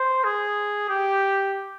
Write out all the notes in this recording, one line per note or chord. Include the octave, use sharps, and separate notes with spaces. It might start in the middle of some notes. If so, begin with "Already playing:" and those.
Already playing: C5
G#4
G4